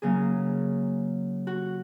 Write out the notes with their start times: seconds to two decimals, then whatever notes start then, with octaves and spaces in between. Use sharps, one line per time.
0.02 C#3 F#3 A#3 C#4 G#4
1.47 F#4